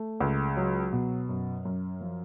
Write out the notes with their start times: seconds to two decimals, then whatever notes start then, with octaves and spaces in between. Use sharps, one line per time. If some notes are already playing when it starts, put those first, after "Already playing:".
Already playing: A3
0.20 C#2
0.57 F#3
0.93 B2
1.29 F#2
1.65 F#2
2.01 F3